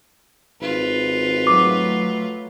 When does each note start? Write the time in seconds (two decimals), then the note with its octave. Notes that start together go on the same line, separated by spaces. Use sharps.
0.61 G#1 F4 B4
1.47 F#3 A3 D6